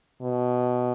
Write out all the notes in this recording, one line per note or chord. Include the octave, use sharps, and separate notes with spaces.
B2